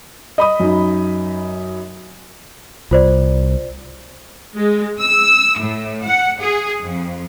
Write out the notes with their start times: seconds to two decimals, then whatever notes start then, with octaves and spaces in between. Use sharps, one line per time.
0.38 D#5 B5 D#6
0.60 F#2 D#4
2.91 C2 F4 C5 D5
4.56 G#3
5.00 E6
5.58 A2
6.04 F#5
6.39 G#4
6.81 F2